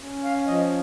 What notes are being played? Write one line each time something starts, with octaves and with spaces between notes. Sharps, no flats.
C#4
F5
F3 D#5